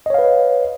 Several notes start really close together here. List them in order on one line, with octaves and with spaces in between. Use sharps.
D#5 C#5 F5 B4